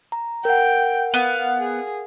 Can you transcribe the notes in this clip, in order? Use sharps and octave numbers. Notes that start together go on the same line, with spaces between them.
A#5
A#4 F#5 G5
B3 F5
G#4